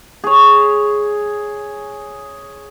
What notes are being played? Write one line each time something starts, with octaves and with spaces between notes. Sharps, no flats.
G#4 C#5